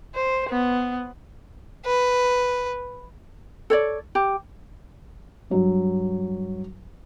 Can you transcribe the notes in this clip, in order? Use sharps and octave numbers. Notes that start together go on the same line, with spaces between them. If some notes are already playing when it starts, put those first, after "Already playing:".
C5
B3
B4
A4 C#5 D5
G4
G2 F#3